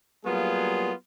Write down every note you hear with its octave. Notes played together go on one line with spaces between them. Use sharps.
F#3 G3 A#3 B3 F4 G#4